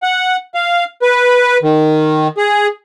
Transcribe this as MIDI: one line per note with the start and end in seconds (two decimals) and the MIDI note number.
0.03 0.36 78
0.54 0.84 77
1.02 1.57 71
1.63 2.28 51
2.38 2.67 68